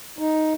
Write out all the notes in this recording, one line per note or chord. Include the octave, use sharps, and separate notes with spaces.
D#4